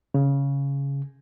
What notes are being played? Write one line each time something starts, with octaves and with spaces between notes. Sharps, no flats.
C#3